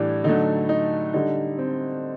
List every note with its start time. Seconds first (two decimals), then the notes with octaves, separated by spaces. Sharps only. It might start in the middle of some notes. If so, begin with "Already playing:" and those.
Already playing: A2 E3 G3 D4
0.24 D3 F#3 A3 D#4
0.69 D#4
1.14 D3 G3 D#4
1.58 C4